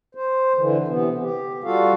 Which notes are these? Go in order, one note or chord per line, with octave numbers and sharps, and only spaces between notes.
C5
D3 E3
C3 E3 B3
G4
G3 F4 F#4 A4 F5